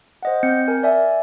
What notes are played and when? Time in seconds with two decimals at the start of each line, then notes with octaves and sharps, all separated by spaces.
0.23 C5 D#5 F#5
0.43 C4 G6 C#7
0.68 A#4 G#5
0.83 D5 E5 G#5